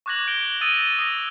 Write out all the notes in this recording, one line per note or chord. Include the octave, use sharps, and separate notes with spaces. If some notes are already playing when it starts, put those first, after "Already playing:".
C#6 D6 F#6 G#6 A#6 F#7
G6 D7 G7
D#6 E6 A6 D#7 G7
A#6
D#6 A#6